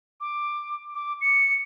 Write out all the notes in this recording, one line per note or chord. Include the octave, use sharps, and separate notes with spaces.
D6
D6
C#7